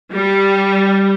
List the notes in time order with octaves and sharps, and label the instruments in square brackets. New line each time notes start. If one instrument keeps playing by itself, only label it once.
[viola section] G3